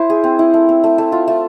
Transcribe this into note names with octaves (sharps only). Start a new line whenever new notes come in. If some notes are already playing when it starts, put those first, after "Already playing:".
Already playing: E4 C5
G#4
C4
E4
A3
C4
A3
A3
F4
A3